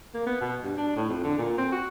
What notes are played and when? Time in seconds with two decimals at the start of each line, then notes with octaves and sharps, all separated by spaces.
0.14 A#3
0.26 B3
0.41 B2
0.63 G2
0.77 D4
0.96 A2
1.09 F2
1.24 D3
1.38 A#2
1.58 C4
1.72 F#4